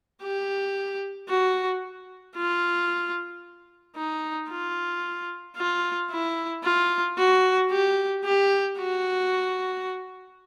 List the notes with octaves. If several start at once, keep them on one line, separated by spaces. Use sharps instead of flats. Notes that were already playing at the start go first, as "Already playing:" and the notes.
G4
F#4
F4
D#4
F4
F4
E4
F4
F#4
G4
G4
F#4